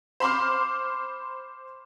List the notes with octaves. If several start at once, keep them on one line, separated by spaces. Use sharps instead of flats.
C5 B5 C6 D6 F6